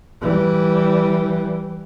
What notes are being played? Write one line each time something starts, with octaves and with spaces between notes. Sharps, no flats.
E3 G3